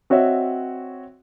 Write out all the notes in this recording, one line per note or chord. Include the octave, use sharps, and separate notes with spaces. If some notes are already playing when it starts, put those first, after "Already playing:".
C4 F#4 C#5 D#5 E5